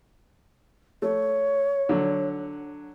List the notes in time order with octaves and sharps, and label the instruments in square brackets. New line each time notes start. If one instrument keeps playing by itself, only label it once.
[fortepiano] A3 [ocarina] C#5
[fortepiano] D3 F#3